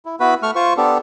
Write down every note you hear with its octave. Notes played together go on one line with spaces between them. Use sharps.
E4
B3 E4 F#4 B4 B5
A3 C#6 F6
F4 C5 C#6
B3 D4 G4 A4